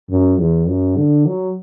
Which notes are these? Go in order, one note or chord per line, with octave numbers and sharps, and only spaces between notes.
F#2
E2
F#2
D3
F#3